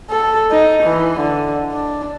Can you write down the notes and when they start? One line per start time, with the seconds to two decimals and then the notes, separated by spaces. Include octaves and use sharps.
0.10 A4
0.51 D#4
0.83 E3
1.19 D3
1.73 D4